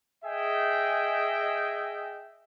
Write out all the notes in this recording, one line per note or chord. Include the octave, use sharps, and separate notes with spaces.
G#4 D#5 E5 G5